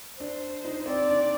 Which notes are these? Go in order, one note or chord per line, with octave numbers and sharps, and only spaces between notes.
D4 C5
D#4
C4 D5
D4